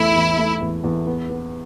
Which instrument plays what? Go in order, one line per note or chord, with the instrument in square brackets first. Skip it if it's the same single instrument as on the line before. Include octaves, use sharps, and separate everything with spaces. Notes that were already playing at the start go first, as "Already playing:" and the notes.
Already playing: [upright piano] E2 A3 [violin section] E4
[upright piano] E2
A3
E2
E2
B3
B3